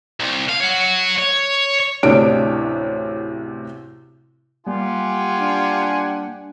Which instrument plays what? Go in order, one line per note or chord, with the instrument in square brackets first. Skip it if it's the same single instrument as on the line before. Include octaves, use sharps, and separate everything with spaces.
[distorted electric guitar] C2
F5
C#5 F#5
C#5
[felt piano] A1 D2 C3 D4 C#5 D7
[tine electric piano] G3 A#3 [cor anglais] F4 [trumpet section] G4 F#5 G#5
[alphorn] D4